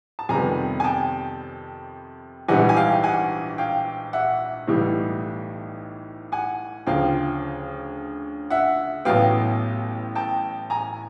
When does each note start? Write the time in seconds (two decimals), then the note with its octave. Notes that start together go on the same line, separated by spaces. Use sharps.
0.19 A5
0.29 F2 C3 D#3 G3 B3 G#5 A#5
0.80 G#5
0.84 G5 A5
2.48 A#1 G#2 E3 G3 F#5 G#5
2.69 G#5
2.77 F5 G5
3.04 F#5 G#5
3.58 F5 G5
4.13 E5 F#5
4.68 B1 A2 E3 G3
6.32 F#5 G#5
6.87 D2 C#3 F3 F5 G5
8.50 E5 F#5
9.05 A1 A2 F#3 B3 F5 G5
10.15 G5 A5
10.70 G#5 A#5